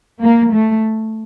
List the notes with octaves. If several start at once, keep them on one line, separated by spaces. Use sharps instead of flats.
A#3
A3